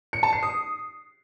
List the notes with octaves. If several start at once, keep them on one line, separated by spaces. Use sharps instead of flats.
C#7
A5
C7
D#6